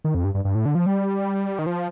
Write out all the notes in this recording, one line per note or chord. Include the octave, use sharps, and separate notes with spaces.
D#3
F2
G2
G2
G2
A2
D3
F3
G3
D#3
F3